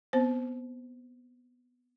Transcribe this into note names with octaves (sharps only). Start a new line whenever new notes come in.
B3 C4 C5